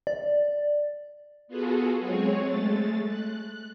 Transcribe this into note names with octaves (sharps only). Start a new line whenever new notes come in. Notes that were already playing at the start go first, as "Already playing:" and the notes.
D5
B3 F4 F#4 G#4 A4
F#3 G#3 C4 G#4 C#5
G#3 A3 A6
F#6